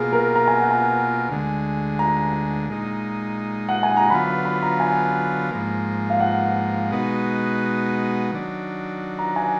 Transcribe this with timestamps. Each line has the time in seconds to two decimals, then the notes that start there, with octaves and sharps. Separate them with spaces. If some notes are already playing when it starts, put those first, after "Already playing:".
Already playing: B2 A#3 F4 G#4
0.12 A#4
0.36 A#5
0.48 G#5
0.60 F#5
0.71 G#5
1.29 D2 D3 G#3
1.99 A#5
2.70 A#2 G#3 D#4
3.69 F#5
3.83 G#5
3.97 A#5
4.10 D3 F#3 B3 F4 B5
4.27 B5
4.45 B5
4.62 A#5
4.80 G#5
5.51 G#2 F3 A#3
6.10 F5
6.20 F#5
6.91 B2 G#3 B3 D#4 F#4
8.31 D#3 F#3 D4
9.19 A#5
9.36 G#5